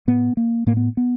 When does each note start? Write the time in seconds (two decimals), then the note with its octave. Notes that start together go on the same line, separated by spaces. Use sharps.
0.07 A2 B3
0.37 A#3
0.67 A2 A#3
0.77 B3
0.97 B3